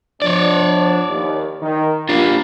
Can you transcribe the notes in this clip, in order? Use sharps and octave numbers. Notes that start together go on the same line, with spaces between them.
F3 B3 D4 C#5 D5
D#2
D#3
G2 G3 A#3 D4 F4